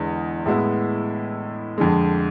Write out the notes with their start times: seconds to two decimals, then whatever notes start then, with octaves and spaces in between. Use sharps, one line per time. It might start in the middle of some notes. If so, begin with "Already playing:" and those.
Already playing: E2 D3 G#3
0.46 A2 G#3 B3 E4
1.78 F2 D3 G#3